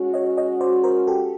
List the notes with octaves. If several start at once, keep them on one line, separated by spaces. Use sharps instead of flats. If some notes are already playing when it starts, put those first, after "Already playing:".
Already playing: G#3 C#4 F#4
C#5 D#5
C#5 D#5
C5 D5
A#4 C5
G4 A4